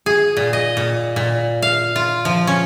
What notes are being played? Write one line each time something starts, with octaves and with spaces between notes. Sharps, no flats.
G#4
A#2
D#5
A#2
A#2
F5
F4
F3
C#4